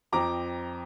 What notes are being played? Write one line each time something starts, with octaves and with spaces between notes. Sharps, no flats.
F2 F3 C4 A#5 D6